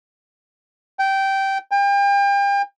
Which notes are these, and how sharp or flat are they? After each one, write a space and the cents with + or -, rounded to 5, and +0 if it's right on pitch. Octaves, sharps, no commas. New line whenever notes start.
G5 -15
G5 +35